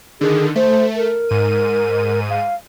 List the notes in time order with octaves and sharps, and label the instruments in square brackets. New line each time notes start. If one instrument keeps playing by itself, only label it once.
[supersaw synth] D3 D#3 [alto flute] G#4
[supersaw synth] A3 [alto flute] C5
[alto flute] A#4
[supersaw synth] G#2 D#7
[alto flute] F5